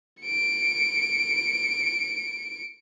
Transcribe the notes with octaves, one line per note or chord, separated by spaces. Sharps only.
C#7 D7